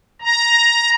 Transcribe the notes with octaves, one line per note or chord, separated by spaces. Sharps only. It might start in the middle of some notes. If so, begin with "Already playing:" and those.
A#5